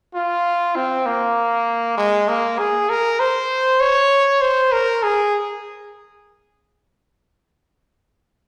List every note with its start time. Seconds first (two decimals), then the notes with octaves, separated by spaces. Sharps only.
0.15 F4
0.76 C4
1.06 A#3
1.98 G#3
2.29 A#3
2.58 G#4
2.89 A#4
3.20 C5
3.80 C#5
4.41 C5
4.72 A#4
5.03 G#4